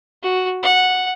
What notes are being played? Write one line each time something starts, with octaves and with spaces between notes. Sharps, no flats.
F#4
F#5